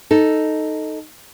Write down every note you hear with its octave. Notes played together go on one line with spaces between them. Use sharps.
D#4 A4